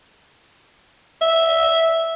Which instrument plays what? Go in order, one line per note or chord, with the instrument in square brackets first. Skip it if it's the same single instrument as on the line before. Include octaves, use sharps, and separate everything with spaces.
[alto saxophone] E5